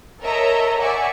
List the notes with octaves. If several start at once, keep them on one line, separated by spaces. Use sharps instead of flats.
A4 A#4 C#5 D#5 E5 A#5
D5 E5 F#5 G#5 C#6 D6